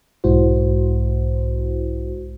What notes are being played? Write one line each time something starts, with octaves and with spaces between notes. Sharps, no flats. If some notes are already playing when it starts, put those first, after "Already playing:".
B1 G#2 G#3 E4 F#4 C5